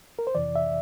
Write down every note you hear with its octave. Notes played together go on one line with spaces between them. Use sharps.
A#4
C5
F2 C3 E3 D5
E5